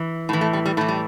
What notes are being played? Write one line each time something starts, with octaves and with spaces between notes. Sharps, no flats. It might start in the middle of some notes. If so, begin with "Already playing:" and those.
Already playing: E3
A2 E3
A3
G3
G3
A2 E3 A3
G3